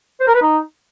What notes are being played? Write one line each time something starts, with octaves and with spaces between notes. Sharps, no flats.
C5
A#4
B4
D#4